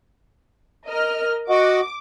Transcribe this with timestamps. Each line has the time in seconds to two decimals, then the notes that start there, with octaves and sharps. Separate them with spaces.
0.85 A#4 D#5 F6
1.50 F#4 D#5 F#5 D6